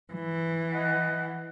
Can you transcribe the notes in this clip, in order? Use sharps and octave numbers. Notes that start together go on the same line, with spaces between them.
E3
D#5 F#5